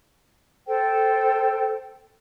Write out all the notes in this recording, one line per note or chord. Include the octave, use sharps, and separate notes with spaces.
A4 C5 G5